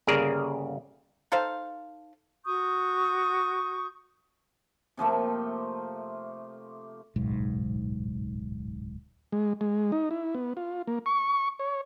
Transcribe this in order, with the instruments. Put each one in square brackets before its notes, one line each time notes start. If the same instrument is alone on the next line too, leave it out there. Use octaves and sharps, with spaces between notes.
[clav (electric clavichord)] G1 C#3 A#3 G#4 A#4 D5
[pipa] D#4 A4 C5 F5
[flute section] F#4 C#6 D#6 G6
[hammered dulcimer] C3 F3 A3 A#3
[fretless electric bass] D1 B1 G#2
[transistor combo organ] G#3
G#3
D#4
E4
B3
F4
A#3
C#6
C#5